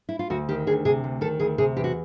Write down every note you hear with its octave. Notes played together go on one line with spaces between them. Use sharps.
E4
F4
D2 F#4
D#3 G4
D2 G#4
C3 G#4
D2
D#3 A4
D2 G#4
C3 G#4
E2 G4
F#4